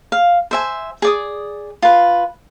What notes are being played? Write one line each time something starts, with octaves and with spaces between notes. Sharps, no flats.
F5
C5 E5 G#5
G#4 D5 D#6
F4 B4